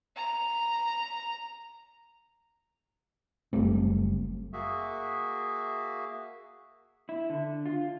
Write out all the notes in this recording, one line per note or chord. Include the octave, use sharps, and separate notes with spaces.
A#5
F#1 G3 A3 C4
A#3 F#4 G#4 E5
E4
D3
F4